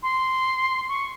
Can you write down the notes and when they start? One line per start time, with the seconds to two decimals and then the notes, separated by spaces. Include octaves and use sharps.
0.03 C6
0.89 C#6